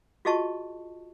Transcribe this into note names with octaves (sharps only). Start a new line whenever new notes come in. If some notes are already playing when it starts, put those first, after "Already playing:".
F4 F#4 G#4 D#5 A5 C#6